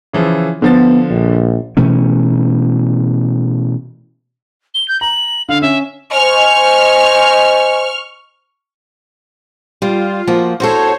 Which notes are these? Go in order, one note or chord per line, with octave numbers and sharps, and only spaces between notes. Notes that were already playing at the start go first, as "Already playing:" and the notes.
C#3 E3 F3
D3 F3 B3 A6
A#1
B2 E3 A3 C#4
G7
G6
A#5 F#7
D3 F5
C#4 E5
C5 D#5 G#5 C#6 F6
G3 F4
F3 A#3 F#4
E2 F#4 A4 C5 C#5